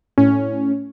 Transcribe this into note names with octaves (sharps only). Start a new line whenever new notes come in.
A2 C#4